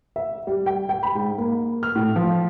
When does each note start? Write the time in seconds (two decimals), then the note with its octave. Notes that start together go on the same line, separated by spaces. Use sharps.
0.16 E5
0.47 G3
0.66 G5
0.89 G5
1.03 B5
1.15 G#2
1.38 A#3
1.83 F6
1.95 A2
2.16 F3